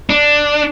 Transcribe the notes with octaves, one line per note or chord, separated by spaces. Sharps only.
D4